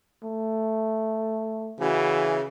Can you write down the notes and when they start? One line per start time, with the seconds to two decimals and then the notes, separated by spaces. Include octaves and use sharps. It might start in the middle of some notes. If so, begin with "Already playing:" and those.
0.23 A3
1.80 C#3 E3 F#4